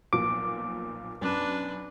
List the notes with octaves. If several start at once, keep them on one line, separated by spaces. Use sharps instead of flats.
B1 A#2 F3 D6
B1 F#2 D4 B4